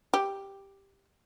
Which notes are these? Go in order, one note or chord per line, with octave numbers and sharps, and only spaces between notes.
G4